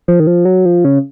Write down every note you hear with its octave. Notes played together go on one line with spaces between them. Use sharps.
F3
D#3
F3
F#3
F3
C#3